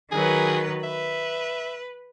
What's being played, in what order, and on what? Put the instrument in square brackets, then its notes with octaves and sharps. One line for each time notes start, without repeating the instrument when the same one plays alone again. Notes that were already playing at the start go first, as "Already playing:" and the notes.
[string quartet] D#3 F#3 B4 [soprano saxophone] G#4
[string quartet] B4 [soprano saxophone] E5